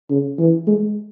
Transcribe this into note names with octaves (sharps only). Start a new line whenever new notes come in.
C#3
E3
G#3